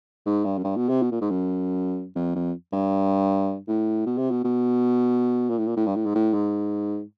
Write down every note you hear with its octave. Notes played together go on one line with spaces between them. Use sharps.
G#2
G2
F#2
G2
B2
C3
B2
A#2
G#2
F#2
F2
F2
G2
A2
B2
C3
B2
B2
A#2
A2
A#2
A2
G2
A2
G#2
A2
G#2